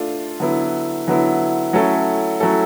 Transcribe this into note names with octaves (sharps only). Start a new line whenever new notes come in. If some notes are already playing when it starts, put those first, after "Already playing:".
Already playing: A3 D4 F4 A4
D3 F#3 B3 E4
D3 F#3 B3 E4
F#3 A3 C#4 E4 A4
F#3 A3 C#4 E4 A4